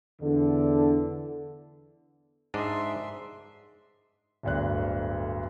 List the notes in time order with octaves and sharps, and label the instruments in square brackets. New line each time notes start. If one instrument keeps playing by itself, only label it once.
[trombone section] E2 D3
[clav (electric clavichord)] G#2 D4 D#5 [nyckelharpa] E5 C6
[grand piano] D1 G1 D2 D4 F#6